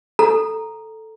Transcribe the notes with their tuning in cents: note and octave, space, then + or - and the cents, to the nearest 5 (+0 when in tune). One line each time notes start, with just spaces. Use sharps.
A4 +0 A#5 +0